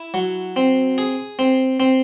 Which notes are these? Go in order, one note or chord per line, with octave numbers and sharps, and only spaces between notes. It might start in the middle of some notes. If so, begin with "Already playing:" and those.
Already playing: E4
F#3
C4
G#4
C4
C4